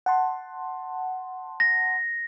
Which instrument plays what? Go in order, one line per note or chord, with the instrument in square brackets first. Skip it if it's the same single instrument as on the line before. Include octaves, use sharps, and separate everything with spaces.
[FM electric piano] F#5 A5 C6
[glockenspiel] A#6